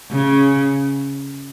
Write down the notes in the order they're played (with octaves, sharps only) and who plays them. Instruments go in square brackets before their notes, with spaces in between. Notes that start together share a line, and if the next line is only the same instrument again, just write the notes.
[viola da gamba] C#3